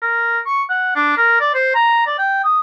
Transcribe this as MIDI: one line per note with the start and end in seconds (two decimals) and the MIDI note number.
0.02 0.39 70
0.46 0.62 85
0.70 0.94 78
0.96 1.17 62
1.17 1.39 70
1.41 1.54 74
1.54 1.73 72
1.75 2.05 82
2.06 2.14 74
2.18 2.41 79
2.44 2.61 87